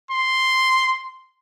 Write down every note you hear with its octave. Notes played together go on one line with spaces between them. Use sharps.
C6